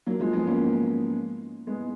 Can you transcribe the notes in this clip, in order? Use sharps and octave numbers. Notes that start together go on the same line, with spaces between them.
F#3 A#3
F3 G#3
G#3 B3
A#3 C#4
G#3 B3